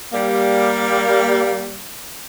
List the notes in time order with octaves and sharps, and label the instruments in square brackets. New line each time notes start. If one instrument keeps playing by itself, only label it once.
[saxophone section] G3 A#3